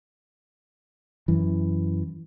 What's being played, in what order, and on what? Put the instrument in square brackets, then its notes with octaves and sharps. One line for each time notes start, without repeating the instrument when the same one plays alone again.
[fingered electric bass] F#2 E3